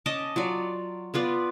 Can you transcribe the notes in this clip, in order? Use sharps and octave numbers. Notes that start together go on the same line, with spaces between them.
C#4 D#5 A5 D6
F#3 F4 D5
B3 F4 B4 D5